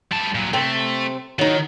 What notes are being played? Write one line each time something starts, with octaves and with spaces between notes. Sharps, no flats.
G3 A5
A#2 F#3
C3 A3 C4
D#3 F#3 D#4